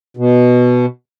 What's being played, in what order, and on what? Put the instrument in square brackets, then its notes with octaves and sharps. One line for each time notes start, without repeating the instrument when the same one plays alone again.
[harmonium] B2